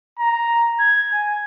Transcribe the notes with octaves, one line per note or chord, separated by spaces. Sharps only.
A#5
G#6
G#5